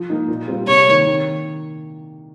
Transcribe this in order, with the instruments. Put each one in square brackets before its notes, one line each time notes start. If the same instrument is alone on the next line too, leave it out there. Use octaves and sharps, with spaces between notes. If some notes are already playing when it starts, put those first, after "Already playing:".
Already playing: [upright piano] F3
A#3 D#4
A#2
G3 C4 F4
[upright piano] C3 [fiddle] C#5
[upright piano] D#3 A#3
D#3